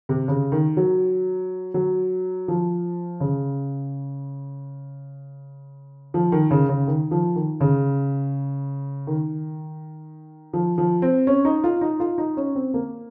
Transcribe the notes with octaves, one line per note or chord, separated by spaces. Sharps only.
C3
C#3
D#3
F#3
F#3
F3
C#3
F3
D#3
C#3
C#3
D#3
F3
D#3
C#3
D#3
F3
F3
C4
C#4
D#4
F4
D#4
F4
D#4
C#4
C4
A#3